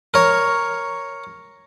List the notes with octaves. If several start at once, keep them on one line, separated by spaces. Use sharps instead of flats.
A#4 C#5